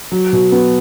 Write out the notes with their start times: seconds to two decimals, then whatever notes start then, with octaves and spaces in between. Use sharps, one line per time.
0.12 F#3
0.33 B2
0.52 B3